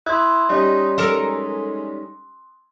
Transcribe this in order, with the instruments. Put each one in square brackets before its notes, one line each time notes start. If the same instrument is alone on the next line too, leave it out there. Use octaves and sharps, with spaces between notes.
[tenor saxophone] E4 [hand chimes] C6 D#6 F#6 [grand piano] G#6
[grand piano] G3 C#4 D#5 [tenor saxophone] D#4
[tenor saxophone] G#3 [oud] D#4 A4 A#4